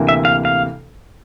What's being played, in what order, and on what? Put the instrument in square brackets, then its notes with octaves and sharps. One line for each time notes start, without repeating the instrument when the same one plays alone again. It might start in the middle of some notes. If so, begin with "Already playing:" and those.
Already playing: [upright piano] D2 C3 E3 A#3
[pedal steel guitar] E5
F5
F5